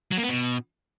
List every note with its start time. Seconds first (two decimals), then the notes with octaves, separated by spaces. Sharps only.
0.12 F#3
0.18 A#3
0.24 B3
0.29 B2